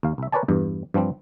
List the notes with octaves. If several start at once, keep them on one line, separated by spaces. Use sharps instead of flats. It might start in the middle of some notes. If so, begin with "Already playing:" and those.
D#2 F5
C2 E5
A#4 B4 C#5 D5 G#5 A5
E2 G2
G2 F3 G3 C4